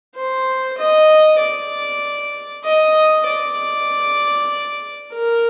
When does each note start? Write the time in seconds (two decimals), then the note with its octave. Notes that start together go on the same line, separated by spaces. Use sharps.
0.16 C5
0.78 D#5
1.39 D5
2.64 D#5
3.27 D5
5.13 A#4